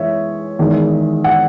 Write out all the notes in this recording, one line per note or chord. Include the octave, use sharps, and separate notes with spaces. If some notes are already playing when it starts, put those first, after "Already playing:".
Already playing: E3 G#3 C#5 E5
E2 D#3 G#3
F#5